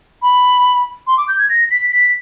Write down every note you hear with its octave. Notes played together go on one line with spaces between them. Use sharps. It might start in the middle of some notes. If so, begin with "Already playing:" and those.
B5
C6
D6
G6
G#6
A#6
B6
B6